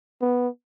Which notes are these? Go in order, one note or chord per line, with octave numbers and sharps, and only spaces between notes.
B3